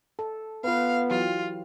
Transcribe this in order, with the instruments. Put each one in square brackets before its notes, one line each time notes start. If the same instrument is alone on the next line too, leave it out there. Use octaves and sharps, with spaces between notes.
[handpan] A4
[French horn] B3 [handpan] F4 B4 [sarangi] F5
[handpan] E3 F#3 G4 [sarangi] F4